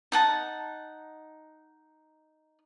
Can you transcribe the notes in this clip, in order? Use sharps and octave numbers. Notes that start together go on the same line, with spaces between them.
D#4 F#5 A5